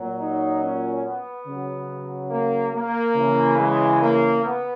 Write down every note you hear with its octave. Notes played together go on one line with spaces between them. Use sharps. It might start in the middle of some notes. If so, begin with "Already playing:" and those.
Already playing: A#2 F#3
D#4
C#4
B3
C#3 F#3
A#3
A#3
C#3 E3
G#3
A#3
B3